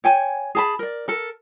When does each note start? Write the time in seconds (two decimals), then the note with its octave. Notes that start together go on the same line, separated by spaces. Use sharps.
0.04 C#5 G5 G#5
0.55 G#4 A5 B5
0.79 A#4 D5
1.08 A4 A#4